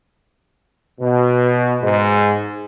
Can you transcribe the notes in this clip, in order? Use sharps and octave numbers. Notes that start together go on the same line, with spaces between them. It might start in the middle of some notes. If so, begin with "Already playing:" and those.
B2
G#2 G#3